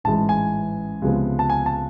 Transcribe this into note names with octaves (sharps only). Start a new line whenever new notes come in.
A1 G#2 E3 G#3 A5
G#5
C#2 C3 F3 G#3 B3
A5
G#5
A5